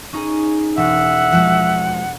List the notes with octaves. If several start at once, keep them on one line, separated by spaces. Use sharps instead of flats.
C#4 D#4 G#4
E1 E5 F#5
F3 G#3 F#4